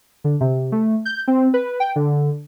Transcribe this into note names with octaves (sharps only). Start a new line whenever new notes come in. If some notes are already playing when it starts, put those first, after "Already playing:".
D3
C3
A3
G6
C4
B4
G5
D3